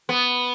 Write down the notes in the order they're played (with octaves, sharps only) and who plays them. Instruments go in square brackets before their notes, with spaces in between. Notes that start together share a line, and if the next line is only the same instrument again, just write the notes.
[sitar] B3